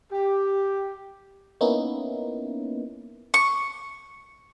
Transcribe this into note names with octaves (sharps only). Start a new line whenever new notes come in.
G4
A#3 B3 C#4 D#4 E4
C#6